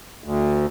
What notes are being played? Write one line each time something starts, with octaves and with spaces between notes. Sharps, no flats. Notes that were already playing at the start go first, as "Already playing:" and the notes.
D2